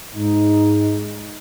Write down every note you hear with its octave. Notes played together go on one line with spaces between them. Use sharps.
G#2 D#4